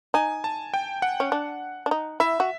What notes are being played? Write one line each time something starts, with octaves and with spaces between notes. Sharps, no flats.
D#4 G#5
A5
G5
F#5
C#4
D4
D4
D#4
E4 E5
F#4